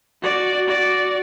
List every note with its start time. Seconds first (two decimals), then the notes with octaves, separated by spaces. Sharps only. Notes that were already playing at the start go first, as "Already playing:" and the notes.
0.22 F#4 D5
0.68 F#4 D5